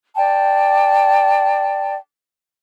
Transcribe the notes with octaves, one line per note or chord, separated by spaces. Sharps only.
D5 G5 A5